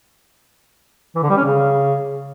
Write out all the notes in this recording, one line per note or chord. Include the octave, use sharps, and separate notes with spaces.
E3
D3
G3
C#4
C#3